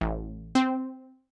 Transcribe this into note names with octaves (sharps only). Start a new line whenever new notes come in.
A1
C4